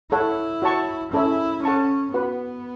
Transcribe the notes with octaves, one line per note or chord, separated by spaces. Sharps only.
E4 A4 C#5 F#5
F#4 C#5 A5 C#6
C#4 E4 A4 C#5 E5
C#4 A4 F#5 A5 C#6
B3 F#4 B4 F#5